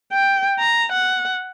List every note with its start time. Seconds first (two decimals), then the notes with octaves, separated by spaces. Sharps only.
0.13 G5
0.59 A#5
0.92 F#5